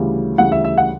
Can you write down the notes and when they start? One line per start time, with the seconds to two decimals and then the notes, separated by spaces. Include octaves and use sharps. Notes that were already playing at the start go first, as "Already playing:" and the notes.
Already playing: D2 C#3 E3 G3
0.38 D2 C#3 E3 G3 F#5
0.52 E5
0.64 E5
0.78 F#5